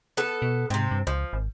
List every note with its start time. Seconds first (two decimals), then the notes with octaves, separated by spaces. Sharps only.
0.17 B3 A4
0.42 B2
0.70 G#2 C3 C4
0.91 G2
1.07 C#2 F3
1.33 G#1